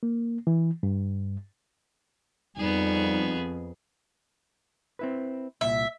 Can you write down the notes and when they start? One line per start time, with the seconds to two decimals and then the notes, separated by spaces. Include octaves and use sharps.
0.03 A#3
0.47 E3
0.83 G2
2.56 F2 G3 B3 D#4 G#4
4.99 C4 E4 B4
5.61 C2 A#2 E5